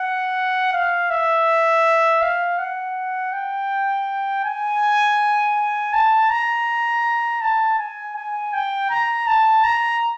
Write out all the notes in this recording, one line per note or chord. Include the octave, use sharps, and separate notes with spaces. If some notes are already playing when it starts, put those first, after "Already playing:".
Already playing: F#5
F5
E5
F5
F#5
G5
G#5
A5
A#5
A5
G#5
G#5
G5
A#5
A5
A#5